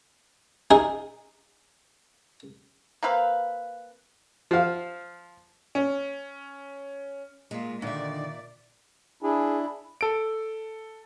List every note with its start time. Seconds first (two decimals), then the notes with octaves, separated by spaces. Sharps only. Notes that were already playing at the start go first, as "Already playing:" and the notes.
0.71 D#4 G#4
3.03 A#3 C4 B4 F5
4.51 F3 F5
5.75 C#4
7.51 A#2 G#3 F4
7.82 A#2 D3 D#3 D#4 D5 E5
9.23 D4 E4 G#4
10.01 A4 D7